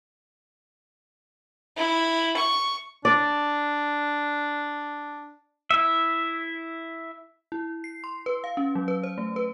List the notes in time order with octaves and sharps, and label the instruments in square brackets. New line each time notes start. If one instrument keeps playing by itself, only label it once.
[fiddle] E4
C#6
[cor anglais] D4 [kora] D5
[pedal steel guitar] E4 E5
[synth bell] E4
C7
C6
B4
F5
C#4
F#3
B4
C5
A3
B4